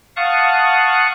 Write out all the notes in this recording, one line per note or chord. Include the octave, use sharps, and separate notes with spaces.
F5 F#5 A5 C#6 D#6 F#6